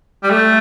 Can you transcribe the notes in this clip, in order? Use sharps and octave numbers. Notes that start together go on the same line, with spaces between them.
G3
A3